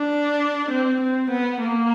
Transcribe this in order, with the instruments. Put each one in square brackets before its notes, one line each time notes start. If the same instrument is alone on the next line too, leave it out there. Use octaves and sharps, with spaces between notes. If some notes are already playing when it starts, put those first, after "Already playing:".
Already playing: [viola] D4
C4
C4
B3
A#3